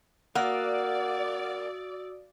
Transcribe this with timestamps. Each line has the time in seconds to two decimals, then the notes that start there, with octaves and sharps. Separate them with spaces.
0.35 A#3 F#4 D5 F#5 D#6 E6